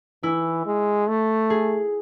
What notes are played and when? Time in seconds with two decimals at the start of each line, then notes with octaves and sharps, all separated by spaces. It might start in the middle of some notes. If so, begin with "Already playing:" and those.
0.23 E3 E4
0.66 G#3
1.08 A3
1.50 G#4